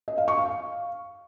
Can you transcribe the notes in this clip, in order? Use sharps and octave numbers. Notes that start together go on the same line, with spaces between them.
D#5
F5
C#6
F5